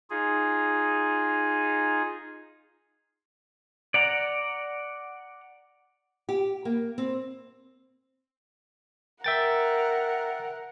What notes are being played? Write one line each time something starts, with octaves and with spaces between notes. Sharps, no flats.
D#4 F4 G#4
D5 F#5 A#5
G4
A#3
C4
A#4 E5 F#5 G5 A6